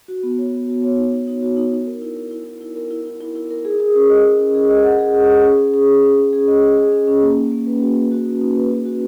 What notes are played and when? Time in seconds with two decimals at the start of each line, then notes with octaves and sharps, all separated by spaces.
0.08 F#4
0.23 B3
0.38 C#5
0.53 B3
0.68 F#4
0.83 C#5
0.97 D#4
1.13 D#4
1.27 D#4
1.42 F#4
1.57 D#4
1.72 D#4
1.87 A#4
2.02 E4
2.17 A#4
2.31 E4
2.46 E4
2.61 E4
2.76 A#4
2.91 E4
3.06 E4
3.21 E4
3.36 E4
3.51 A#4
3.65 G#4
3.80 G#4
3.95 C#4
4.10 D#5
4.25 D#5
4.39 C#4
4.55 G#4
4.69 D#5
4.84 F#5
4.99 G#4
5.14 G#4
5.29 G#4
5.44 C#4
5.59 C#4
5.74 G#4
5.88 G#4
6.03 C#4
6.18 C#4
6.33 G#4
6.48 D#5
6.62 G#4
6.77 G#4
6.92 C#4
7.08 C#4
7.22 A#3
7.37 D#4
7.52 A#3
7.67 B4
7.82 F#4
7.97 B4
8.11 F#4
8.26 D#4
8.41 D#4
8.56 B4
8.71 F#4
8.86 F#4